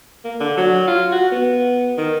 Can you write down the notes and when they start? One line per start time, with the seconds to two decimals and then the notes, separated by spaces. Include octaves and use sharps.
0.25 A#3
0.40 D3
0.58 F#3
0.88 F4
1.12 F#4
1.32 B3
1.98 D#3